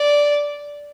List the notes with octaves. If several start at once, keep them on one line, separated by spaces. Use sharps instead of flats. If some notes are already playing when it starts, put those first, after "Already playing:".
Already playing: D5